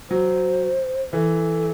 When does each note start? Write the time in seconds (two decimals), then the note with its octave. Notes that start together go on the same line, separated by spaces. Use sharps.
0.10 F#3 C5
1.13 E3 A4